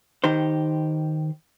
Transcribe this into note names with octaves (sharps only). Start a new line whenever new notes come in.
D#3 D#4 G4 C5